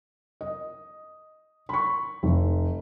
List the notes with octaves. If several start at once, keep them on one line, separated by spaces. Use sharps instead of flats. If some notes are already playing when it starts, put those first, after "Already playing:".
D#5
B5 C#6
F1